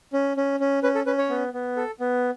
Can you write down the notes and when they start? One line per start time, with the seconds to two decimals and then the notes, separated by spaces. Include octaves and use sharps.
0.13 C#4
0.37 C#4
0.60 C#4
0.83 C#4 B4
0.95 A4
1.06 C#4 B4
1.18 C#5
1.29 B3
1.53 B3
1.77 A4
2.00 B3